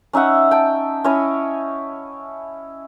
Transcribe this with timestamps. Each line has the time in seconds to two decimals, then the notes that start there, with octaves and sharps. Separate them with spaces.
0.13 C#4 D#4 E5 F#5
0.51 G5 A5
1.04 C#4 E4 C#5 D#5